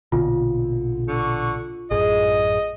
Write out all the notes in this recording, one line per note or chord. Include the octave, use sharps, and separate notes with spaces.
A#1 B2 D3 F4
D3 C#6
A1 F#2 G#4 D#5